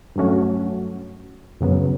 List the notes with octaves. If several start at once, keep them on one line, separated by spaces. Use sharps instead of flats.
G2 F#3 A3 C#4 F#4
F#2 C#3 F#3 B3